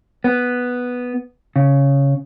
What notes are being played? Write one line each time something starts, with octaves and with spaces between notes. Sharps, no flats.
B3
C#3